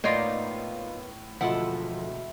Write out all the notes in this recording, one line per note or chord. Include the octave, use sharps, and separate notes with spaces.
A2 A#3 B3 D#4 F4 C#5 D5
E1 D2 F3 E4 F4 A4 D#5 F#5